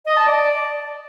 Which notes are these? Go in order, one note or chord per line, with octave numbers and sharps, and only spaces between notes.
D#5
A5
D5